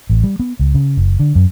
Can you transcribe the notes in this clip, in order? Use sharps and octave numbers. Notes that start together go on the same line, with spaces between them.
A1
G3
B3
C#2
C#3
F#1
D3
F#2